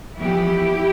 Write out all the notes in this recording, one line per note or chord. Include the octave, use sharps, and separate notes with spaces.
F2 E3 G3 B3 E4 G4